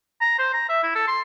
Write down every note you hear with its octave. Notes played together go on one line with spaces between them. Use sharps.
A#5
C5
A#5
E5
E4
A4
C6